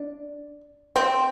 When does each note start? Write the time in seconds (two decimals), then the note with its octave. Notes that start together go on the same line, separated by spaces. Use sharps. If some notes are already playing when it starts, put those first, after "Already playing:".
Already playing: D4
0.96 C4